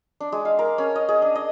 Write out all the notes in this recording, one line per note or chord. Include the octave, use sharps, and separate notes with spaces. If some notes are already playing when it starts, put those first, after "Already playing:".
D4
G#3
F5
A#4
C#4
D#5
G#4
D4
D#5